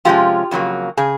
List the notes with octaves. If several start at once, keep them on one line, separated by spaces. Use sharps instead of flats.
C3 F3 G#3 C#4 F4 G4
F2 C#3 F#3 A#3
C#3 G#4